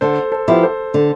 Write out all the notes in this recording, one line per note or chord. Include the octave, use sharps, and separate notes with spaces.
D3 A4 C5
A4 C5
F3 B3 E4 G4
A4 C5
D3